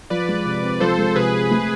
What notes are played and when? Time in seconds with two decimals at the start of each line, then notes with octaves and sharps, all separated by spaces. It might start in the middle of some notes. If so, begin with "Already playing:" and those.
0.10 F3 B4 D5
0.28 G#3
0.46 C3
0.63 C4
0.80 F3 A4 C5
0.98 G#3
1.16 C3 G#4 B4
1.34 C4
1.51 A3